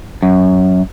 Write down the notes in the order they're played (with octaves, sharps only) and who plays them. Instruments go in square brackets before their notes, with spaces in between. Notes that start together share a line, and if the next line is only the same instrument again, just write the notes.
[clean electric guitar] F#2